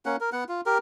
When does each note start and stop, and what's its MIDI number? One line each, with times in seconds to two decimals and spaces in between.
0.06 0.16 58
0.06 0.16 61
0.06 0.16 78
0.20 0.30 70
0.32 0.44 59
0.32 0.44 78
0.49 0.61 65
0.66 0.78 67
0.66 0.78 70